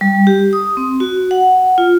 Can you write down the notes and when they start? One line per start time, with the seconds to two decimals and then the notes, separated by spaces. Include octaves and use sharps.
0.01 G3
0.27 G4
0.53 D#6
0.77 C4
1.00 F#4
1.31 F#5
1.78 F4